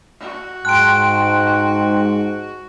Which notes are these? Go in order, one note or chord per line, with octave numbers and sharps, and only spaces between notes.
F#4
G#2 G5 A5 C6 F#6 D7